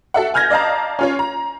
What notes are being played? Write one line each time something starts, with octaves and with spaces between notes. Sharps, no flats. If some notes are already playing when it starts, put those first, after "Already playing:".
F#4 A4 E5 F#5
G#5 F6 G6 G#6 A#6
D5 D#5 F5 A5 A#5
C#4 F4 C#5
A#5